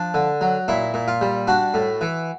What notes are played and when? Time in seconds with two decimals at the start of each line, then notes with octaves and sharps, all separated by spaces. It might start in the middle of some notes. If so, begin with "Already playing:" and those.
Already playing: F3 D4
0.14 D3
0.41 F#3
0.68 A#2 E4
0.94 A#2
1.08 F4
1.21 G3
1.47 D4 F#4
1.74 A2
2.01 E3